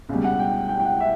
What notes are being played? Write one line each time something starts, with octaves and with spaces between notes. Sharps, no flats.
C#2 B2 G3
F#5
G5
G5
G5
F#5
E5